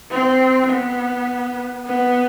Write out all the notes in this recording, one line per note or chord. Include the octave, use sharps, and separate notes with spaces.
C4
B3
B3